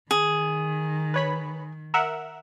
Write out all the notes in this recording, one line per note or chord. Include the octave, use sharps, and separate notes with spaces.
D#3 G#4
B4 C#5 B5
A#4 E5 F#5